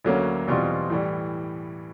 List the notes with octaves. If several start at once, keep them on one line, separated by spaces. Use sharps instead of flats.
D2 D3 F#3 A#3 C#4
E2 B2 G3 C4 F4
A2 E3 G3